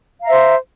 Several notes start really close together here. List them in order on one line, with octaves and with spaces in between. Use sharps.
F5 A#5 E5 C5